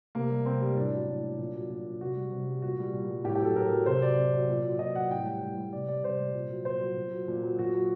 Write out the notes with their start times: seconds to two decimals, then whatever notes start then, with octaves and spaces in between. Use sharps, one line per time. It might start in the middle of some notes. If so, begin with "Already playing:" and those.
0.15 C3 A#3
0.31 G3
0.46 C3 C4
0.62 G3
0.76 A2 D4
0.93 F#3
1.08 A2
1.24 F#3
1.38 A#2
1.55 F#3
1.70 A#2
1.86 F#3
2.01 C3 F#4
2.16 G3
2.32 C3
2.47 G3
2.62 A#2 F#4
2.79 G3
2.93 A#2
3.10 G3
3.24 A2 G4
3.35 G4
3.41 F#3 A4
3.55 A2 A#4
3.72 F#3
3.86 C3 C5
4.02 F#3 D5
4.17 C3
4.34 F#3
4.49 A#2
4.65 F#3
4.79 A#2 D#5
4.95 F#3 F#5
5.11 A2 G5
5.26 G3 G5
5.42 A2
5.57 G3
5.72 C3 D5
5.88 G3 D5
6.03 C3 C5
6.20 G3
6.34 A#2
6.50 F#3
6.65 A#2 C5
6.81 F#3
6.97 A#2
7.12 F#3
7.28 A#2
7.44 F#3
7.59 A#2 F#4
7.74 F#3